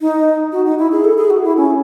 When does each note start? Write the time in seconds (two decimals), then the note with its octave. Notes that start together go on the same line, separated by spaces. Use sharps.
0.01 D#4
0.52 F#4
0.66 D#4
0.78 E4
0.92 G#4
1.04 A4
1.18 G#4
1.30 F#4
1.44 E4
1.57 C#4